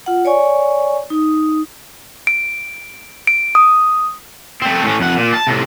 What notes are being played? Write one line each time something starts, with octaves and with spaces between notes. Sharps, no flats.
F4 F#5
C#5 D5 G#5 C#6
D#4 D#6
D7
D7
D#6
A3 C4
A2 C#4
F2 F#5
A#2
A5
A2 C3